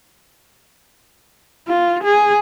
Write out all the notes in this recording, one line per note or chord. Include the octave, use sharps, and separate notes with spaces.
F4
G#4